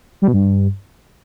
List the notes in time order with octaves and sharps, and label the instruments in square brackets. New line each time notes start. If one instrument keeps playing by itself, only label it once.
[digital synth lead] G3
B2
G2